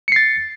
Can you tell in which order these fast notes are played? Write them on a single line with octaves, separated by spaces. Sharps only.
C#7 C7 A6